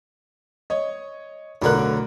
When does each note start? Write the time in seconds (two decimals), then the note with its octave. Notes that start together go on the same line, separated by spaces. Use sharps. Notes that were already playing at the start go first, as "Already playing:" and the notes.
0.70 C#5 D#5
1.62 B1 A2 D3 A#4 F#6